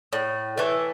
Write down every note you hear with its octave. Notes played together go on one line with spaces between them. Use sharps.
A2
E3 A3